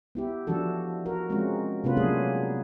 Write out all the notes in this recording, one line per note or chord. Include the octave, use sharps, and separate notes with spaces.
B3 E4 G4
E3 F3 D4 F#4 A4
F#4 A#4
G#3 C4 C#4 F4 F#4
C3 A3 B3 C#4 F4 B4
F#3 A#3 B3 D4 G#4